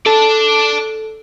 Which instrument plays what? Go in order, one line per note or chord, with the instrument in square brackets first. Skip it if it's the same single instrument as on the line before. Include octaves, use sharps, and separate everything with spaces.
[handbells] A4 [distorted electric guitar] D5 A5